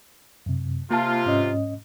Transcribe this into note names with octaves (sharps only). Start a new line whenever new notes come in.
F#2 C3
C3 A#3 F4 A5
G#2 C#4 D#5